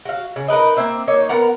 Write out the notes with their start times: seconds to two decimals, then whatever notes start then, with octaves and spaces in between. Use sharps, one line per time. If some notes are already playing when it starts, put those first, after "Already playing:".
0.05 F#4 F5
0.36 C#3
0.48 D#4 A#4 B4 D#5
0.77 A#3 C4 E5
1.08 A#3 D#4 C#5
1.29 B3 A#4 F#5 A#5